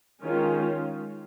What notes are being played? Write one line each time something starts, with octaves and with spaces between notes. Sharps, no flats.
D#3 G#3 C#4 F4